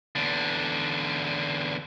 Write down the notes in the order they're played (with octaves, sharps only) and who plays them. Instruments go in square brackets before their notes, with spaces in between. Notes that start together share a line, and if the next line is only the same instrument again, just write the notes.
[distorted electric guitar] E2 D3